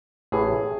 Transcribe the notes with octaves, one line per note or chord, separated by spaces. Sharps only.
A1 A2 E3 G#4